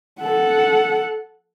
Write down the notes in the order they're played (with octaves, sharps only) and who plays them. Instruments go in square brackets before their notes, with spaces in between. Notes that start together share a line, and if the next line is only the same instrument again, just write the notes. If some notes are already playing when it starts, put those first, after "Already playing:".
[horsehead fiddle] A4 F#5